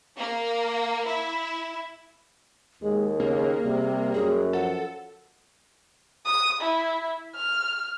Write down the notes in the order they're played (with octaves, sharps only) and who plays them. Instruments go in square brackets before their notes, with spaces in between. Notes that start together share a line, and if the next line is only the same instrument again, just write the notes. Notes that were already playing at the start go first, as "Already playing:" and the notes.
[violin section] A#3
E4
[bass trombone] D#2 [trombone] G#3 [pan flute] G#4
[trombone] C#3 [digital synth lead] A#3
[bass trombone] C3 [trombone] G3
[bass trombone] F#2 [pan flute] G#4
[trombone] F3 [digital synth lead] A4 [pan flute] F#5
[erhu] D#6
E4
F6